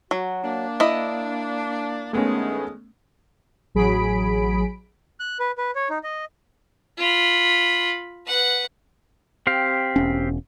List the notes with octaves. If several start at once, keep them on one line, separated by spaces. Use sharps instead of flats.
F#3 F#4
A#3 D4
E4 D#5
G2 D#3 G#3 A3 B3 C#4
A1 F#3 G#4 B5 B6 D7
F#6
B4
B4
C#5
D#4
D#5
F4 B5
B4 F#5
C4 G4 F5
E1 C#4